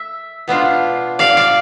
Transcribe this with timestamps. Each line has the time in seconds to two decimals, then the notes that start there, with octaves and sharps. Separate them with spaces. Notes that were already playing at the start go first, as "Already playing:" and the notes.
Already playing: E5
0.48 B2 B3 D4 F4
1.19 D5 F5
1.37 D5 F5